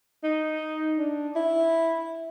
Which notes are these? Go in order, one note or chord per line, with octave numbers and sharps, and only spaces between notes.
D#4
D4
E4